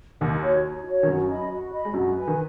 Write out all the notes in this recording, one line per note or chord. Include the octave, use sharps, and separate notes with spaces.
D#2 D#3 D#4
F#4 C#5
D#4
F#4 C#5
D#3
F#2 F#3 F#4
D#5 B5
F#4
D#5 B5
G#3
F#2 F#3 F#4
B4 G#5
D#3